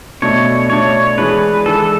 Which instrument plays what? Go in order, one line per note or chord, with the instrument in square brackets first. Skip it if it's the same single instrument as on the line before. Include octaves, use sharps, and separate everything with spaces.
[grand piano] B2 A3 D4 [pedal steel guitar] C#5
[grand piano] B2 A3 D4 [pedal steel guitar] C#5
[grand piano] E3 G#3 D4 [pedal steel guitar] B4
[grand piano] E3 G#3 D4 [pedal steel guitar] A4